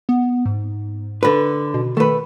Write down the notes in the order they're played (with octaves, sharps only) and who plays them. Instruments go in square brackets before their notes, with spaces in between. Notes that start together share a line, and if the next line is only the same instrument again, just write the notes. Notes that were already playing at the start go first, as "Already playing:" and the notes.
[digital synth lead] B3
G#2
[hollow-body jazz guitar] D3 B4
[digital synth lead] B2
[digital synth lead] D#3 [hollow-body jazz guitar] A3 B4